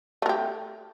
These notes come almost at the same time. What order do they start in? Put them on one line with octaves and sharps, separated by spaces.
A3 A#4 G4